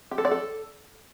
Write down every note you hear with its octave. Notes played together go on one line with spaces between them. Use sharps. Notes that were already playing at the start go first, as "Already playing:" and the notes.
G4
A4
D5
A4